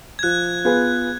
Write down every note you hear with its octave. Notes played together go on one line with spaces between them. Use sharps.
G#6
F3 F#6
B3 F4 G#4 B4